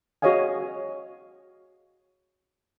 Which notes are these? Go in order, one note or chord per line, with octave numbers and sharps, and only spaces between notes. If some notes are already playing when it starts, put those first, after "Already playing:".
F#4 G#4 C#5 D#5 F5 G#5